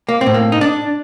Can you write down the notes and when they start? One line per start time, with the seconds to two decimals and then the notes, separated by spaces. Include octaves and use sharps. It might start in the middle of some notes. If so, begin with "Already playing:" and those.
0.09 A#3
0.21 C4
0.26 A2
0.34 A#3
0.52 D#4
0.61 D4